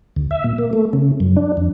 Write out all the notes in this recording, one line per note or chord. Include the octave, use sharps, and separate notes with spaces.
D2
E5
A#2
A#3
A3
C#3
F#2
D4
F2